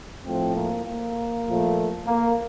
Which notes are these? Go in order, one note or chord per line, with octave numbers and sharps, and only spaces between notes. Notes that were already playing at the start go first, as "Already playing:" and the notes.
A2 F3 A3 C4
A#3
A#3
A#2 F3 A3
A#3